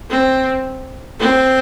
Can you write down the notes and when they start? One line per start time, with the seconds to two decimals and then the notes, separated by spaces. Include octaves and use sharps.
0.10 C4
1.20 C4